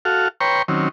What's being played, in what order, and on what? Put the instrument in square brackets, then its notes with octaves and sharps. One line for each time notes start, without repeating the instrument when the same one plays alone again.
[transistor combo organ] F#4 A4 F5
B4 C#5 G5 A#5 C6 C#6
D#3 F#3 C4 C#4